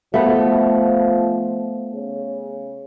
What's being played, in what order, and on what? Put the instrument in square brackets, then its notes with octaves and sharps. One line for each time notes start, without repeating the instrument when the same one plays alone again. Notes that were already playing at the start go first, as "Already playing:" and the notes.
[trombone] F3 [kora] A3 B3
[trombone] C#3